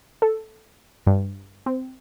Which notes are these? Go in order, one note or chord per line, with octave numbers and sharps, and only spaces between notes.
A4
G2
C4